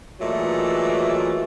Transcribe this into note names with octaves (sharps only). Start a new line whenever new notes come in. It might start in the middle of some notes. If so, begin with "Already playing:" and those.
A#2 E3 F#3 G#3 A3